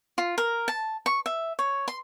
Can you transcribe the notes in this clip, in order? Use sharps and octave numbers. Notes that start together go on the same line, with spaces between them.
F4
A#4
A5
C#6
E5
C#5
C6